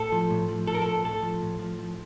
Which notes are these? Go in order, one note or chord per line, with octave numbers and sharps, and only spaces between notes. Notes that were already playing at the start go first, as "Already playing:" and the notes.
Already playing: A2 A4
F3
A2
F3
F3 A4
A#4
A2 A4
A2 A4
F3
A2
F3
F3